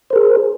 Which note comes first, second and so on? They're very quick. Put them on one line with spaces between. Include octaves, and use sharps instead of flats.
C5 A#4 G#4